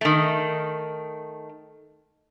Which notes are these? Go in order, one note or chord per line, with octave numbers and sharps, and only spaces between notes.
D#3 A3